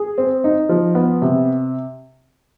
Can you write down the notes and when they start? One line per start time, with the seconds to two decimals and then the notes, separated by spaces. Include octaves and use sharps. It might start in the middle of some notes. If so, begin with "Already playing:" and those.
Already playing: G#4
0.18 C4
0.44 D#4
0.69 F3
0.95 B3
1.22 C3